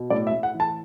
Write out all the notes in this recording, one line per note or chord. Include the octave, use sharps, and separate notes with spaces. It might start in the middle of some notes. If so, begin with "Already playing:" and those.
Already playing: B2
A2 D5
E5
A2
F#5
E3
A5